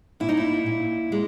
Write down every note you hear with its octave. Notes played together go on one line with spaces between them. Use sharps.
A#2 E4
D#4
E4
A#2
A#2 G#3